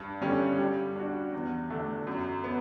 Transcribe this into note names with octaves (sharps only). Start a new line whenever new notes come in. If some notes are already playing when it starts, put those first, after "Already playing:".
Already playing: G2
D3 G3 C#4
G3
D4 F#4
E2
D3 A3 D4
F#2
B3